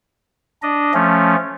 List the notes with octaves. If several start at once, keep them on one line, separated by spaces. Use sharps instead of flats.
D4 D#5
F3 A3 C#4